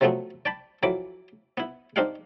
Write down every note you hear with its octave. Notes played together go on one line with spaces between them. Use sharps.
C3 F3 F#3 A3 B3 C4
D5 G5 A5 B5
F2 E3 F#3 B5 D6
B3 E4
C4 D4 D#4 G4 F5 F#5